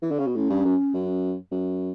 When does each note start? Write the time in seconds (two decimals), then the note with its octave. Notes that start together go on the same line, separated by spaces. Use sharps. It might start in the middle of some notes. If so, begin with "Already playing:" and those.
0.02 E3
0.11 D3
0.19 C#3
0.27 B2
0.35 A2 C#4
0.50 G2
0.65 F#2
0.94 F#2
1.51 F#2